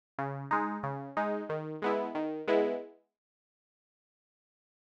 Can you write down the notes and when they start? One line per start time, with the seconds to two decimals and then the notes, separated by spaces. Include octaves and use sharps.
0.19 C#3
0.51 G#3 D#4
0.83 C#3
1.17 G#3 D#4
1.49 D#3
1.82 G#3 B3 E4
2.15 D#3
2.48 G#3 B3 E4